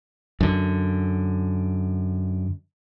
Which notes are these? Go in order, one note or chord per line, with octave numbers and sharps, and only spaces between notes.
F#2 D3